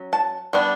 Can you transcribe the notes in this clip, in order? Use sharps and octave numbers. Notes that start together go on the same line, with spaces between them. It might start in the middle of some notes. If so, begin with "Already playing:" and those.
Already playing: F#3 C#4
A5
G3 B3 D4